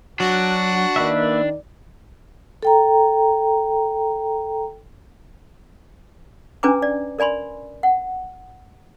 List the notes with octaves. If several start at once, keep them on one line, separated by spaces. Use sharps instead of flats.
F#3 D4 F#4
D#3 A#3 B4 D5 E5
A4 G5 A#5
C#4 D4 B4 G#5 A#5 D6
D5
A#4 D5 G#5 B5 C6
F#5